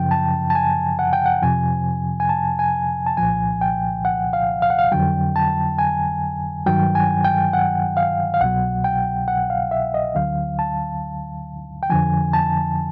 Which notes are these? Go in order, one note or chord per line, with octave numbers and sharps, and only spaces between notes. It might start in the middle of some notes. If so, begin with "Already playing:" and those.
Already playing: F#2 C#3 F3 G5
A5
A5
G#5
F#5
G5
F#5
F2 C3 F3 G#5
G#5
A5
G#5
A5
C2 A#2 F3 G#5
G5
F#5
F5
F5
F#5
F5
F2 D3 F#3 G5
A5
G#5
G2 D#3 F#3 G5
G#5
G5
F#5
F5
F5
C2 B2 F#3 F#5
G5
F#5
F5
E5
D#5
D2 D3 F#3 F5
A5
G5
F2 D3 F3 G#5
A5